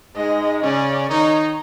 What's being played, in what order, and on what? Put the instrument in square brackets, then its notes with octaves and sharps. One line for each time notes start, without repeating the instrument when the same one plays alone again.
[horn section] G#2 G#3 [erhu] D#5
[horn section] C#3 C#4 [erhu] D5
[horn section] D#3 D#4 [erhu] C#5